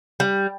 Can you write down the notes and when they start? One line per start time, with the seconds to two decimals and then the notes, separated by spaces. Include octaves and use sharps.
0.20 G3